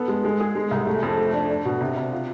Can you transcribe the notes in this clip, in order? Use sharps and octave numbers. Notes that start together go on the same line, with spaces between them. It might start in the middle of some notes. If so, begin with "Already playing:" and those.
Already playing: B3 A4
G#3
G#3
G#4
G#3
C2
A3
F2
A3
D4
D4
B2
C3
C3
F4